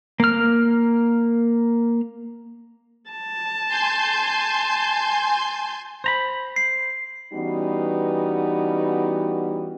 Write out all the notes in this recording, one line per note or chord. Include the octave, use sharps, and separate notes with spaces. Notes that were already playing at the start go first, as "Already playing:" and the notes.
A#3 F6
A5
G#5 C6 G6
C5 A#5 B5
C7
E3 G3 B3 C#4 D#4 F#4